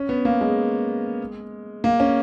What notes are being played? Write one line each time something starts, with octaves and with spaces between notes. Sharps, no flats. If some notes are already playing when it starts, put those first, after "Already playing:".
Already playing: C#4
B3
A#3
G#3
A#3
C#4